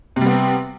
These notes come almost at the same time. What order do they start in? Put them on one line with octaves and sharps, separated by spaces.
C3 G3 B3 C4